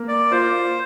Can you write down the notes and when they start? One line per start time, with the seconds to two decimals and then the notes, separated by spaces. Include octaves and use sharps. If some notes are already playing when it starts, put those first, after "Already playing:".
Already playing: A#3
0.08 D5
0.31 F4 C5